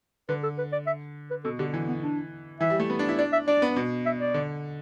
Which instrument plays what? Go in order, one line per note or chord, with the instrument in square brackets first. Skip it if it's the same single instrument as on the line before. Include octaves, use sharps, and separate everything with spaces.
[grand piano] D3 [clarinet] B4
[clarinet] A4
B4
D5
E5
B4
[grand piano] B2 [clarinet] A4
[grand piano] D3 [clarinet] G4
[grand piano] E3
[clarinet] B3
D4
[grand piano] E3 [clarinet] E5
[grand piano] G3
A3
B3
D4
E4
[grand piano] D4 [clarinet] D5
[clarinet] E5
[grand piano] D4 [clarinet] D5
[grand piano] B3
B2
[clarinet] E5
D5
[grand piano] D3